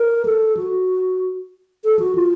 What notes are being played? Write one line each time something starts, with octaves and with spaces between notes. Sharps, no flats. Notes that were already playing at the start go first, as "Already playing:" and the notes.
Already playing: A#4
A4
F#4
A4
F#4
F4